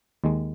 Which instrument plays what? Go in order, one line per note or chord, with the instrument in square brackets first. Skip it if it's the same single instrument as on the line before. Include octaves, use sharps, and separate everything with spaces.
[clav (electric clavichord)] D#2 D#3 G#3